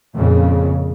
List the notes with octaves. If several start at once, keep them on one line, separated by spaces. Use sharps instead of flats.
F2 A#2 C#3